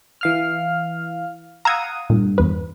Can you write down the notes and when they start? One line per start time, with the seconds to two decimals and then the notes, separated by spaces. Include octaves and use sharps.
0.21 E3 F5 F6
1.65 F5 F#5 A#5 D#6 E6 G#6
2.10 G2 A#2
2.38 E2 B4